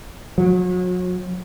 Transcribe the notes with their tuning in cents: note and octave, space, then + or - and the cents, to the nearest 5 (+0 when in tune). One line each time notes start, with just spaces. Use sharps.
F#3 -35